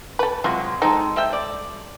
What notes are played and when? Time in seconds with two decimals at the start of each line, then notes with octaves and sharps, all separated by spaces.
0.19 A4 B4
0.44 C3 F#3 G#3 F4 F#4
0.82 G#3 C4 D#4 A4
1.16 G3 E5 G5
1.33 D5